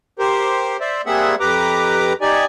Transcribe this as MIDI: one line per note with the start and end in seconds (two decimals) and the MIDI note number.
0.19 0.77 67
0.19 0.77 70
0.19 0.77 72
0.81 1.02 72
0.81 1.02 74
0.81 1.02 76
1.06 1.35 55
1.06 1.35 58
1.06 1.35 60
1.06 1.35 68
1.06 1.35 76
1.06 1.35 78
1.40 2.13 41
1.40 2.13 67
1.40 2.13 71
1.40 2.13 82
1.40 2.13 86
2.21 2.45 63
2.21 2.45 67
2.21 2.45 74
2.21 2.45 80